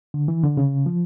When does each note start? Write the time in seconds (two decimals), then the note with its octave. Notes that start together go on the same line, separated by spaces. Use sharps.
0.14 D3
0.28 E3
0.43 D3
0.57 C#3
0.86 F3